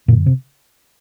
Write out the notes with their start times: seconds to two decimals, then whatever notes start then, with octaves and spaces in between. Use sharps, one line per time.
0.08 F#2 A#2 D3 A#3
0.26 C3 C4